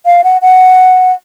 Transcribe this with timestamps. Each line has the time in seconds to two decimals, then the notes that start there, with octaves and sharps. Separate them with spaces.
0.06 F5
0.24 F#5
0.42 F#5